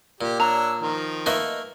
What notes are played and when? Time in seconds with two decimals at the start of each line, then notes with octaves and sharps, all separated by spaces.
0.21 A#2 G4
0.40 D4 C#5 A#5 E6
0.81 D#3 F3 A#4
1.26 A3 A#3 B4 D#5 E5